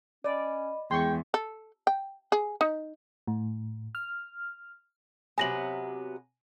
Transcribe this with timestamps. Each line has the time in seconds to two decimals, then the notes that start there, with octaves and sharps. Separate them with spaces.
0.24 C#4 D5 D#5 B5
0.91 E2 G#3 G#4 G5 C6 C#6
1.34 A4
1.87 G5
2.32 G#4
2.61 D#4
3.27 A2
3.95 F6
5.38 C3 F#3 B3 G#5 A#6 F#7